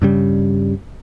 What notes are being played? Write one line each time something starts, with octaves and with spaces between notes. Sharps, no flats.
G2 C#3 G3